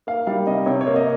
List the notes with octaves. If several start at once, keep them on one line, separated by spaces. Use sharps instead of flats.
A#3 F5
G3 F5
C3 D#5
C3 C#5
C#5
A#3
D#5